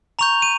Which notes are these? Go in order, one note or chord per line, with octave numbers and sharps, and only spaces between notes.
A#5 C#6 G6 F7
D#7